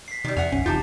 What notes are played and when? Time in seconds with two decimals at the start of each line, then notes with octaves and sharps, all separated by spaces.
0.08 B6 C7
0.24 C3 D#3 G3
0.37 F2 E5 F#5 G#5 F7
0.52 F#1 B1 C#4
0.66 F1 C3 E3 D#4 F4 G4 A5 A6